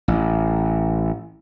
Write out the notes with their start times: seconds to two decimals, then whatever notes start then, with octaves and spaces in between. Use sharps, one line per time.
0.08 A1